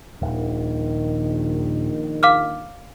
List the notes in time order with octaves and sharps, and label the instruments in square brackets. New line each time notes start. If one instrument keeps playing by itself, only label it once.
[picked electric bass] D#1 [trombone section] A#1 D#3
[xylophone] F5 D6 F6